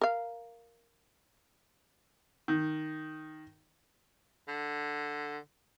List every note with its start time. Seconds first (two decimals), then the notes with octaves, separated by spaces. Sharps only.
0.01 A#4 F5
2.48 D#3
4.48 D3